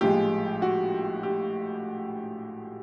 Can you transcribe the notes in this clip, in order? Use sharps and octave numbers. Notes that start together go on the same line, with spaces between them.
A#1 A2 F3 G#3 G4
F#4
G4